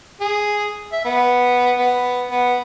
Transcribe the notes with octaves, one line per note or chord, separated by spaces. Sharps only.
G#4
E5
B3
B3
B3